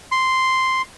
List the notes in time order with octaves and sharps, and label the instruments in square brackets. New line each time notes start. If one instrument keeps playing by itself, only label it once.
[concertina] C6